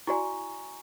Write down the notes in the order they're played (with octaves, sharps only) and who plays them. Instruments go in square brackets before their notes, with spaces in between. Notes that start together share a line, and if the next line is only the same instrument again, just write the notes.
[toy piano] E4 F#4 D5 [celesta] G#5 A#5 C#6